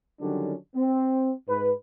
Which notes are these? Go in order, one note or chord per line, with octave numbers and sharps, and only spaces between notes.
D3 D#3 F#3 G3 C#4 D4
C4
G#2 B4